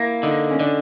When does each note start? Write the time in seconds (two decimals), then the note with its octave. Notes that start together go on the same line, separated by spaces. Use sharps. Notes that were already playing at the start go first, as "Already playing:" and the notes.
Already playing: A#3 E4
0.23 D3 D#4
0.51 C#4
0.59 D3 D4